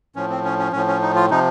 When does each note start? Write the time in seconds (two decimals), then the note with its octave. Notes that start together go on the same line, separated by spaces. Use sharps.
0.16 A2 F3 C#4
0.30 C4
0.45 C#4
0.59 C#4
0.72 A2 F3 C#4
0.88 C#4
1.02 D#4
1.16 F4
1.30 C3 F3 D#4